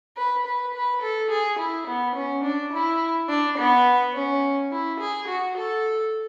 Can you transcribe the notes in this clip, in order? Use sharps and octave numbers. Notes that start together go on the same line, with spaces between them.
B4
B4
B4
A4
G#4
E4
B3
C#4
D4
E4
D4
B3
C#4
E4
G#4
F#4
A4